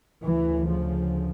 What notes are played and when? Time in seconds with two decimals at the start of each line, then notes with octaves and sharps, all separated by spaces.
0.23 D2 C#3 E3
0.68 F3